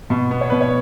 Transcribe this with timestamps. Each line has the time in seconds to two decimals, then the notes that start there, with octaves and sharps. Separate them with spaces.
0.10 B2
0.31 B3
0.41 C#5
0.50 B2 B4
0.61 C#5